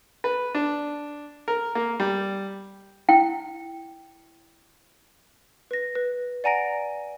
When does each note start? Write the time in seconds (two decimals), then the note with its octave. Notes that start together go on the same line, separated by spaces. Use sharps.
0.24 B4
0.55 D4
1.48 A#4
1.75 A#3
2.00 G3
3.09 E4 G5
5.71 B4 A#6
5.95 B4
6.44 D5 F#5 G#5 A#5 A#6 D7